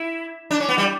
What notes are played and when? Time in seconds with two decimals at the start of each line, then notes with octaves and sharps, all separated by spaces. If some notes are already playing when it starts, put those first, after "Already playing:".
Already playing: E4
0.51 D4
0.60 C#4
0.69 B3
0.78 G3